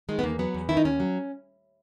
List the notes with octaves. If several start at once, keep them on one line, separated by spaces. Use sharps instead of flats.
D#3 G#3
B3
E2 A#3
F#3 B3
E2
D#3 E4
D#4
D#2 C#4
F#3